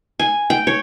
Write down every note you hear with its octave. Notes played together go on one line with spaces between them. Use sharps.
G#5
G5
C#5